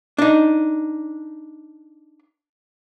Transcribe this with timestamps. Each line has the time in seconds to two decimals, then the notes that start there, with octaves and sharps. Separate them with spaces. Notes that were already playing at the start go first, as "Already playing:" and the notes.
0.18 D4 D#4